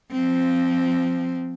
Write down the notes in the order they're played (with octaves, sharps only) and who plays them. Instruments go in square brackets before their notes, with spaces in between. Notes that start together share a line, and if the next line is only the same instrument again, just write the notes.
[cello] F3 C4